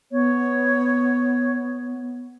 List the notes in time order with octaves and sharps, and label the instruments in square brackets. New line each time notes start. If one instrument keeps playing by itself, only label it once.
[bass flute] B3 [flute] C#5